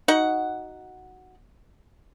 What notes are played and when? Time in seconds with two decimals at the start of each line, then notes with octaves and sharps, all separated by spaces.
0.08 D#4 F#4 F#5